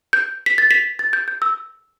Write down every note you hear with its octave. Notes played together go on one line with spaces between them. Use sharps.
G6
B6
A6
B6
A6
G6
G6
E6